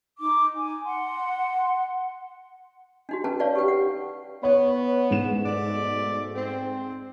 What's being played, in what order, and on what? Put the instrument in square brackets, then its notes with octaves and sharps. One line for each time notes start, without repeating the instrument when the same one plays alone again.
[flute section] D#4 D6
G#5
F#5 C6
[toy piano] D4 D#4 F#4
C#4 A4 B4 G5 A5 A#5
D#4 B4 C#5 D5 F5
G4 A4 B4 G5
F#5
[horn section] B3 [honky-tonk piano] C#5
[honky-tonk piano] G#2 E7
[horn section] B2 A3 D5
C4